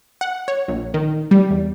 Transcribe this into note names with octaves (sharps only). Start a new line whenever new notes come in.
F#5
C#5
A#1
D#3
G3
E2